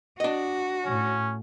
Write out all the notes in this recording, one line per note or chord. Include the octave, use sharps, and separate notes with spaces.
D4 F#4 D#5
A2 C#4